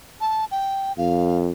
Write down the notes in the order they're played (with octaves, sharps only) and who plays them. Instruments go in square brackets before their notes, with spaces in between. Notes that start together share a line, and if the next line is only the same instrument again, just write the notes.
[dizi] A5
G5
[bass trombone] F2 [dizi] F5